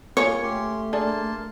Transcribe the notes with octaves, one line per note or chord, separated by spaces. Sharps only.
A#3 F4 G#4 A#4 C#5
A3 C#4 G4 C6
A#3 D4 G#4 A4 A5 C6